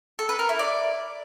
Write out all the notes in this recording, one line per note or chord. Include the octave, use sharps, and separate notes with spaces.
A4
B4
A#4
E4
D5